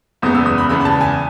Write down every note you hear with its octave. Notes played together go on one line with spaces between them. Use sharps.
F#1 E2 C#3 G#3 B3 D#6
E6
D#6
B5
F#1 E2 C#3 G#3 B3 B5
B5
A5
G#5